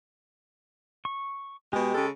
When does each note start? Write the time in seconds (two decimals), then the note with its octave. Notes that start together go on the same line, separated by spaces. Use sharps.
1.05 C#6
1.73 B2 G#3 G4
1.95 C#3 G#3 A4